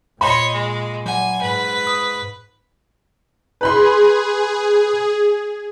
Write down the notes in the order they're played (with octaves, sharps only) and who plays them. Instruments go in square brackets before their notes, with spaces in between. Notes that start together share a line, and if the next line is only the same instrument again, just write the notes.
[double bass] A#2 [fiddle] C#5 D#5 [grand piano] B5 C6
[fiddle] G#3
[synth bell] F#3 F#5 [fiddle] G#5
[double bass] G#2 [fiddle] B4
[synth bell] D#6
[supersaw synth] G#4 [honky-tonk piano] B4 B5 C6